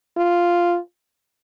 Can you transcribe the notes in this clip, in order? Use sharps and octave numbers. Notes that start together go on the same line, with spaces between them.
F4